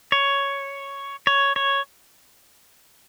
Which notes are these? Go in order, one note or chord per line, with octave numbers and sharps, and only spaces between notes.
C#5
C#5
C#5